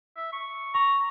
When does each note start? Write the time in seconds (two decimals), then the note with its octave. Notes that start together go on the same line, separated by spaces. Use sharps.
0.16 E5
0.33 C#6
0.75 A#5 C#6